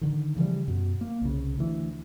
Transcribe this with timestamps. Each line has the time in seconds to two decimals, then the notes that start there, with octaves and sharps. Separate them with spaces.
0.01 D3 D#3
0.36 C#3 E3 F3 G3
0.68 F#2 B2
1.01 A#3
1.21 C2 C#3
1.58 D2 E3